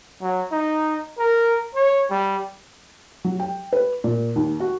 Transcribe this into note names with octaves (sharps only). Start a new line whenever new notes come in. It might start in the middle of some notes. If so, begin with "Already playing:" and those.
F#3
D#4
A#4
C#5
G3
F#3
G5
B4
A#2
D#2
F#4